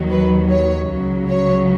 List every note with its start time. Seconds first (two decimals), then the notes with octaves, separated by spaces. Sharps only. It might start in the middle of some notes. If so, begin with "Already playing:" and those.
Already playing: D#2 D#3 F#3
0.10 B4
0.49 C#5
0.89 C#2 C#3 F#3
1.28 C#5